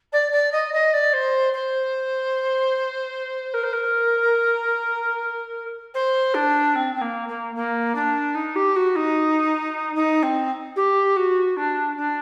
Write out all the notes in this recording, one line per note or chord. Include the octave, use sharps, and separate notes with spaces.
D5
D5
D#5
D#5
D5
C5
C5
A#4
C5
A#4
C5
D4
C4
C4
A#3
A#3
A#3
D4
D#4
G4
F#4
D#4
D#4
C4
G4
F#4
D4
D4